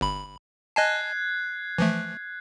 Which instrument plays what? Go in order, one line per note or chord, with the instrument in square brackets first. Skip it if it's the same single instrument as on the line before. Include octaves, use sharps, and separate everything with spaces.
[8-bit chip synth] G1 B5
[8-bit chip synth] D#5 G#5 A5 [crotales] F#6 G#6 C7
[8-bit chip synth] E3 F3 A3